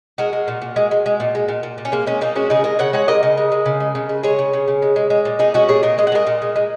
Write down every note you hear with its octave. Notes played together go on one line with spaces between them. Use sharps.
G#3 F#4 A#4
G#3
A#2
A#2
G#3
G#3
G#3
A#2
G#3
A#2
A#2
A#2
C#4
G#3 A#3
G#3 C#4
A#2 A#3 D#4
G#3 C#4 F#4
C#3 D#4 G#4
G#3 A#4 D#5
C#3 C#5 F#5
G#3 C#5 F#5
G#3 A#4 D#5
C#3
G#3
G#3
C#3
G#3
C#3
G#3
G#3 G#4 C#5
C#3
C#3
C#3
G#3
G#3
G#3
A#2
A#2 D#4 G#4
G#3 C#4 F#4
A#2 G#4 C#5
A#2 A#4 D#5
G#3 D#5
F#5
G#3 A#4 D#5
A#2
G#3
G#3